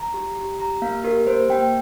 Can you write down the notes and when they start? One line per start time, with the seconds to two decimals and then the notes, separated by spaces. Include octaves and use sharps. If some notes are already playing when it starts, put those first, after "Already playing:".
Already playing: A#5
0.14 G4
0.37 G4
0.59 G4 A#5
0.82 A#3 F5
1.04 G4 A#4
1.27 A#3 C5
1.49 A#3 G5